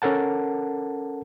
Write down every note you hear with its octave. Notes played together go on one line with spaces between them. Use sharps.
C#4 A4 A#4 F#5 A5